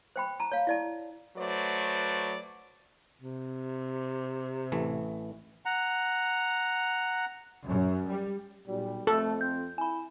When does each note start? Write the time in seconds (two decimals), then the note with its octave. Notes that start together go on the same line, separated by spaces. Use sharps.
0.16 C5 G5 B5
0.40 A5 A#5
0.52 C#5 F5
0.67 E4 D5 A5
1.37 F#3 A3 B4 C5 D5
3.22 C3
4.72 A1 E3 A3
5.65 F#5 A#5
7.66 F#2
8.08 G3
8.68 B1 A#2 G3
9.07 F2 A3 A4
9.41 C4 G6
9.78 E4 G#5 B5